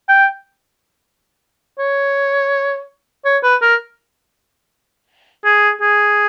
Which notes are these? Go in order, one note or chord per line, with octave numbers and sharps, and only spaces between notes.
G5
C#5
C#5
B4
A#4
G#4
G#4